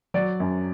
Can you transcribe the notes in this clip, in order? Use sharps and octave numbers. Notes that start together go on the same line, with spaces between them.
F#3 D5
F#2